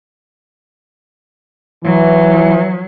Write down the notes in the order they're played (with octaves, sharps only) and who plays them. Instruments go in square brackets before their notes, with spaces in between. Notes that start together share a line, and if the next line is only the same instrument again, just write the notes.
[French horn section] E3 [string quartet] F#3